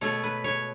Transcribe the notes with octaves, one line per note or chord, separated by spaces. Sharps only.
B2 A3 C#5
B4
C#5